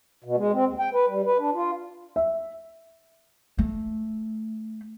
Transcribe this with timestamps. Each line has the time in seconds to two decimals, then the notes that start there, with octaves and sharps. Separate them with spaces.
0.24 B2
0.37 G#3
0.53 C4
0.66 D#2
0.79 G5
0.93 B4
1.08 G3
1.26 B4
1.39 D4
1.54 F4
2.16 E5
3.58 A3